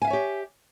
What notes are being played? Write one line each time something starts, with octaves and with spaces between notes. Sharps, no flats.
G4 C#5 E5 F5 G#5